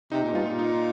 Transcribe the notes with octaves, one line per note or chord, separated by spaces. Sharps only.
C3 D#4
A#2
G2 F4
A#2
D#4